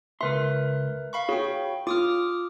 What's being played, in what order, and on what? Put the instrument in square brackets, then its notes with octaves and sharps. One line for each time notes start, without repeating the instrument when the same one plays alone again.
[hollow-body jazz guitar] C#2 C6 [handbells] A#4 B4 E5
[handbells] F5 B5 C#6
[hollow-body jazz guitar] F#4 G#4 [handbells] C#5 G5
[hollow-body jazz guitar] F4 [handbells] D6 D#6 F6